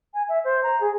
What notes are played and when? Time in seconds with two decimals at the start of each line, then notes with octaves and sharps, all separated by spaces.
0.14 G#5
0.29 E5
0.44 C5
0.63 A#5
0.80 G#4